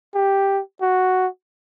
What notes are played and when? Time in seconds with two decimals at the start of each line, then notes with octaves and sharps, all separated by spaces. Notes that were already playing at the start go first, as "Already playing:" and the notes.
0.15 G4
0.81 F#4